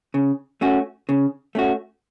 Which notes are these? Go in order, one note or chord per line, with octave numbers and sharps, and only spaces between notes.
C#3
A3 C#4 F#4
C#3
A3 C#4 F#4